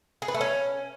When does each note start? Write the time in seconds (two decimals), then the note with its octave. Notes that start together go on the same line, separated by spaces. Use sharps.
0.22 G#4
0.28 B4
0.34 A3
0.41 C#4